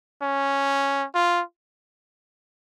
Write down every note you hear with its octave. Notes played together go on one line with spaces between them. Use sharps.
C#4
F4